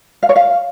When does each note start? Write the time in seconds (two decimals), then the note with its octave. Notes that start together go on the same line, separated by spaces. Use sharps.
0.23 F5
0.29 C#5
0.36 F5